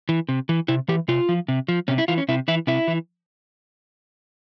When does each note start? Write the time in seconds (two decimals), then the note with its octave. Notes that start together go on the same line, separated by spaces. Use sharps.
0.09 E3
0.29 C3
0.49 E3
0.68 C3 E4
0.88 E3 G4
1.08 C3 F4
1.29 F3
1.48 C3
1.68 F3
1.88 C3 C#4
1.98 E4
2.08 E3 F4
2.18 C#4
2.29 C3 E4
2.48 E3 E4
2.67 C3 E4
2.88 E3